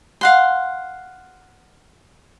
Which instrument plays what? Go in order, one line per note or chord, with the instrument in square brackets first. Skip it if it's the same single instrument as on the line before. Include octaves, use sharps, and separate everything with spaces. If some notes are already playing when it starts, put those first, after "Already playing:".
[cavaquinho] F5 F#5 C6